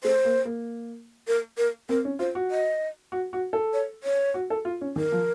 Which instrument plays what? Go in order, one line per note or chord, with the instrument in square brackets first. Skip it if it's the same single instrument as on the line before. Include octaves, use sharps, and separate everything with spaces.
[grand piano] A3 [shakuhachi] C5
[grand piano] A#3
A#3
[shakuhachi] A#4
A#4
[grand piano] C4 [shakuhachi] A#4
[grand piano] C#4
[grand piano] F4 [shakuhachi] C5
[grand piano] F#4
[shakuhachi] D#5
[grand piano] F#4
F#4
A4
[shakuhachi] C#5
C#5
[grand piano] F#4
A4
F4
C#4
[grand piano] D#3 [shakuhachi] A#4
[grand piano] F3